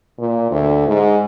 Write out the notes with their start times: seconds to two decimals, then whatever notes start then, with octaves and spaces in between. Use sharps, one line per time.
0.19 A#2
0.51 D2
0.88 G#2